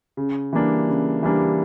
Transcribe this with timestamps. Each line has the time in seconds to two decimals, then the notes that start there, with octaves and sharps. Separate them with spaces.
0.17 C#3
0.53 E3 G3 A#3 D4
0.88 C#3
1.23 E3 G3 A#3 D4